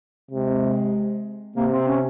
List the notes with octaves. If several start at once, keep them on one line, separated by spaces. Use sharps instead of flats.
C3 G#3
C3 A#3
C4
C#4